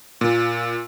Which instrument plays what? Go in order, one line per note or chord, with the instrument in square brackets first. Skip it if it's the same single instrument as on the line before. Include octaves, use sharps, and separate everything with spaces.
[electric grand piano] A#2